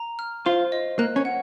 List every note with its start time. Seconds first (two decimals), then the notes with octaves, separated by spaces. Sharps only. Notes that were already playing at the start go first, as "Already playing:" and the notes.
Already playing: A#5
0.19 F6
0.46 F4 C5
0.72 D#5
0.99 A#3 F#6
1.16 C#4
1.25 F#5